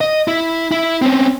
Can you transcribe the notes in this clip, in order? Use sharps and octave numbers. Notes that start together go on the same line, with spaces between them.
D#5
E4
E4
C4 C#4